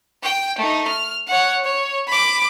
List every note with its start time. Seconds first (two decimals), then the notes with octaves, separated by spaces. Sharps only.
0.23 G5
0.58 A3 D#4
0.88 F6
1.28 C#5 F#5
1.64 C#5
2.07 B5 D6